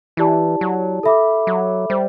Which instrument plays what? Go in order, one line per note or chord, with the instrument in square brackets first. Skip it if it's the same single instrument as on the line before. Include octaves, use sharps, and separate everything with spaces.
[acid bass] E3 [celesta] E4 G4 D5 A5
[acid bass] F#3
[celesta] A4 E5 B5 D6
[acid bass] F#3
[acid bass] G3 [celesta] C5 E5